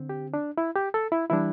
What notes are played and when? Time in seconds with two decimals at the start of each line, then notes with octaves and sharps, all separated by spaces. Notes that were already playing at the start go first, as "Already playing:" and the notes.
Already playing: D3 C4
0.09 G4
0.34 D4
0.58 E4
0.76 G4
0.94 A4
1.12 E4
1.30 E3 G3 D4 E4